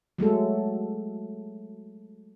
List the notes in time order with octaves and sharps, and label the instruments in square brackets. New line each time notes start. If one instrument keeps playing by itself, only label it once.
[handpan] F#3 G#3 A3 A4